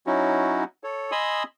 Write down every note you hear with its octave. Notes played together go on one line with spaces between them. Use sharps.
F#3 C#4 D#4 E4 F#4
A4 C#5
D#5 G#5 B5 C6 D#6 E6